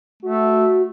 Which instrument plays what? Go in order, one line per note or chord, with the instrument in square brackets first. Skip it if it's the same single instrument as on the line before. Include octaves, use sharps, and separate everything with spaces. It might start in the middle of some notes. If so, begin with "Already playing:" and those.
[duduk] A3 [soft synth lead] F#4